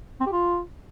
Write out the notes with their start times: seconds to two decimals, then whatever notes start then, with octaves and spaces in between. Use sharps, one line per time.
0.20 C4
0.26 G4
0.32 F4